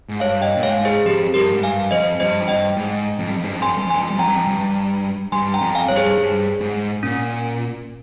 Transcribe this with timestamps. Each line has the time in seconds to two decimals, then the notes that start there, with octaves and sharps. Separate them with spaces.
0.09 G#2
0.20 G2 C#5 F5
0.42 D#5 G5
0.57 A#2
0.63 G#2 C#5 F5
0.85 G#4 C5
1.06 F2 G4
1.34 G2 G4 A#4
1.52 G#2
1.63 G2 F5 G#5
1.91 F2 C5 D#5
2.20 G2 C5 D#5
2.41 F2
2.48 G2 D#5 G5
2.77 G#2
3.19 F2
3.28 G2
3.37 F2
3.44 G2
3.53 F2
3.60 G2 G#5 C6
3.69 F2
3.77 G2
3.86 F2
3.90 G2 G#5 C6
4.02 F2
4.11 G2
4.19 F2 G5 A#5
4.28 G2
4.36 F2
4.47 G2
5.32 G2 G#5 C6
5.54 G5 A#5
5.61 F2
5.75 F5 G#5
5.88 G2 C#5
5.96 G#4 C5
6.17 G2
6.61 G#2
7.03 A#2 C#4